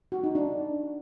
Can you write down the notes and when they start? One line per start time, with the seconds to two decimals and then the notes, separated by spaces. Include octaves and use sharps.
0.12 F#4
0.24 D#4
0.35 D4